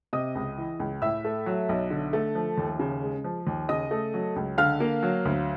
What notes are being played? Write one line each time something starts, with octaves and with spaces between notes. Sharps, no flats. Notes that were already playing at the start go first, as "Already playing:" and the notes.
C3 D#5 D#6
C#2
E3
C#2
A2 E5 E6
A3
F#3
B1
D3
A3
F3
D#2
C#3
G#3
F3
D#2
C#3 D#5 D#6
A3
F#3
C#2
D3 F5 F6
A#3
F#3
D2